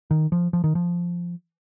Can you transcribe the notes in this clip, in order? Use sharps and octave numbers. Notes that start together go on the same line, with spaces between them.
D#3
F3
F3
D#3
F3